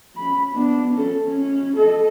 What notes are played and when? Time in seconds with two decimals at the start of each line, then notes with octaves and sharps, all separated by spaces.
0.16 C#4 B5
0.52 B3 D4
0.93 C#4 A4
1.23 C#4
1.76 A4 D#5